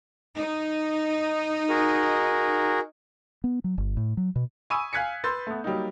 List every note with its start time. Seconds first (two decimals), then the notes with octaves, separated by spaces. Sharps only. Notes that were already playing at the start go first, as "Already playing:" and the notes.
0.37 D#4
1.69 F#4 G#4 A#4
3.44 B3
3.64 F#3
3.78 G1
3.97 A2
4.17 F#3
4.36 B2
4.70 G#5 B5 C#6 D#6 E6 D#7
4.93 F5 G#5 F#6 G#6 B6 C#7
5.24 B4 C6 E6 G6 A6
5.47 A3 B3
5.64 F#3 G3 A#3 D#4